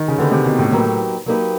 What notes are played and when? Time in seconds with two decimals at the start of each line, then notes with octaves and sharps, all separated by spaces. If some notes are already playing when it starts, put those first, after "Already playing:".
Already playing: D#3
0.08 C#3
0.18 D3 F#3 A#3 D#4 G4 B4
0.31 C3
0.45 B2
0.59 A2
0.72 F#3 A#3 D#4 G4 B4
1.26 F#3 A#3 D#4 G4 B4